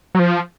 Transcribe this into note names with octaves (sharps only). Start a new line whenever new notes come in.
F#3
F3